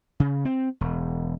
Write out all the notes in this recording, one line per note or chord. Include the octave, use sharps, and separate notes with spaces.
C#3
C4
E1